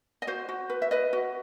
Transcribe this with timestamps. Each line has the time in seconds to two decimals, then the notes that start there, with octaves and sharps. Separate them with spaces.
0.22 D#5
0.27 F#4 C5
0.49 F#4
0.70 B4
0.82 E5
0.91 B4 D#5
1.13 F#4